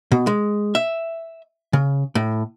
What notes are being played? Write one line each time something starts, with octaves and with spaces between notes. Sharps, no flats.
B2
G#3
E5
C#3
A2